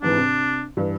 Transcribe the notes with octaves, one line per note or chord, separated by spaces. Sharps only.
C2 G#2 E3 D4
C3
G2 E3